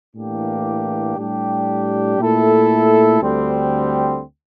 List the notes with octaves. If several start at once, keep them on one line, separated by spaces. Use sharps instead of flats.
A2 E3 A#3 D4 G4
A2 G3 D4 G4
A#2 A3 E4 A4
D2 D3 G3 C4